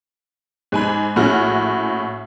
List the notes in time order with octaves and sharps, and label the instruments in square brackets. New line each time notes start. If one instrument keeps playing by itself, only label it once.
[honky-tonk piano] G#2 G#5 B5
A#1 A2 C#4 F#4 G#4 F6